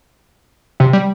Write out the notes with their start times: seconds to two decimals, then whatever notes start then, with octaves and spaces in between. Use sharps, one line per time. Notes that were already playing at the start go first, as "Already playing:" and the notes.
0.80 C3
0.93 G3